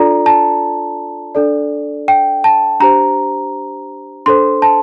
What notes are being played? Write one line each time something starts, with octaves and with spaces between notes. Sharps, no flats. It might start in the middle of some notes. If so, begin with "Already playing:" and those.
Already playing: D4 F4 A4 D5 A#5
A5
D4 A4 D5
G5
A5
D4 G4 C5 A#5
D4 A4 C5 C6
A5